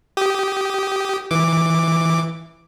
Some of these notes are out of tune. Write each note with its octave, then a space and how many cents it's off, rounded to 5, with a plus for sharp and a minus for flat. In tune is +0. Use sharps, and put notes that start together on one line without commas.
G4 -15 D#6 +0
E3 -10 D6 +0